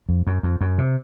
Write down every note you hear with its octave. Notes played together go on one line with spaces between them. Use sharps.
F2
F#2
F2
F#2
C3